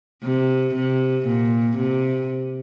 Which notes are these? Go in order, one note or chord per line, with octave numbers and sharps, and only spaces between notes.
C3
C3
A#2
C3